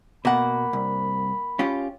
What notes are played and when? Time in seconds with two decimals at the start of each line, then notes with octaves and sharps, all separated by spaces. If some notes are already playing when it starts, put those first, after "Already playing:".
0.25 B2 A#3 F#5 B5
0.73 C2
1.59 C#4 F4 G4